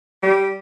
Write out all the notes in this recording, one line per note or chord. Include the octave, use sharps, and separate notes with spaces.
G3